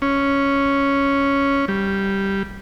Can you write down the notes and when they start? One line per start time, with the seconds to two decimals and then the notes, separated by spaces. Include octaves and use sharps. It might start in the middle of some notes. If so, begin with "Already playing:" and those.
0.02 C#4
1.68 G3